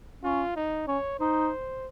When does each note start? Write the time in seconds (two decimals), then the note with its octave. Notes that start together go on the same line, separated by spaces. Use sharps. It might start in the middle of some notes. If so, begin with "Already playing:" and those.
0.23 C#4 F4
0.56 D#4
0.87 C#4 C#5
1.19 D#4 C5